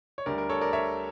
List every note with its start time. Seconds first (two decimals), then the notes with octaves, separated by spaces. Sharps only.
0.18 C#5
0.26 D2 D3 G3 A#4 D5
0.38 A#4
0.49 A4 C#5
0.61 A#4 D5
0.73 C#5 E5